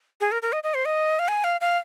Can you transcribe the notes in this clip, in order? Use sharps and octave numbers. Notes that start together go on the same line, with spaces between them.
G#4
A#4
A#4
D#5
D#5
C5
D#5
F5
G#5
F5
F5